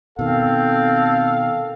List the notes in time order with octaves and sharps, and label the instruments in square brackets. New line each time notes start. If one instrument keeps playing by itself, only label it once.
[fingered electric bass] B2 D#3 [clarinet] C4 [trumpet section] A4 [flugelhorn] F5